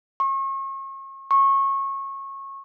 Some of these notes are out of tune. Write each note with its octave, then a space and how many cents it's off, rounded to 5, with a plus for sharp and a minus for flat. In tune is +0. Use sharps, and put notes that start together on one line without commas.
C#6 -40
C#6 -25